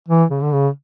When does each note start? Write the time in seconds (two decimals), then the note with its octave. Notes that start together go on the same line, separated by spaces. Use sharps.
0.09 E3
0.30 C#3
0.42 D3
0.53 C#3